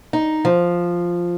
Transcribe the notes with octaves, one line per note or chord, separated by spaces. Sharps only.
D#4
F3